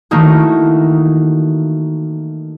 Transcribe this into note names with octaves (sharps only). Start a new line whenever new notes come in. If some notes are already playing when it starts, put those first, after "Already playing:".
D#3 E3 A3 A#3 D#4 F#4